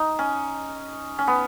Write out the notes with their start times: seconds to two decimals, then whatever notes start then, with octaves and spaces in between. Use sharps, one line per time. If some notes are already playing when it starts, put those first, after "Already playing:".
Already playing: D#4
0.19 C#4
1.19 C#4
1.27 B3